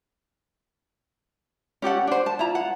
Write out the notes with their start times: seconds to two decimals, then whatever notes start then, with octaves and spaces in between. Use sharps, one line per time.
1.82 C#4 G4 A4 F#5
2.07 D4 C5
2.26 A5
2.39 E4 F4 A#5
2.55 F#5